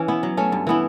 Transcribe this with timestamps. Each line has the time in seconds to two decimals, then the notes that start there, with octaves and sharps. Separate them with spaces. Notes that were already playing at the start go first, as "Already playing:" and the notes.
Already playing: E3 C#4
0.08 B3 E4
0.23 F#3
0.37 A3 C#4
0.52 G2
0.67 E3 B3 E4